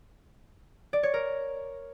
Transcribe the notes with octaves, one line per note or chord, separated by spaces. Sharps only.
D5
C#5
A#4